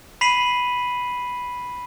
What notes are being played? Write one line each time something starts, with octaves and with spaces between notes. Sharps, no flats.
B5 B6 C7 D#7 F#7